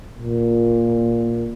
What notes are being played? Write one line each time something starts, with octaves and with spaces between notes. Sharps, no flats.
A#2